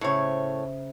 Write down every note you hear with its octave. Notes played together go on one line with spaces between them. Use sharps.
A2 C#3 C5 C#5 E5